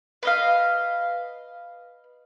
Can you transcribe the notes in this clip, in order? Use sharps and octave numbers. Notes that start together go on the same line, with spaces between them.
B4 D#5 F5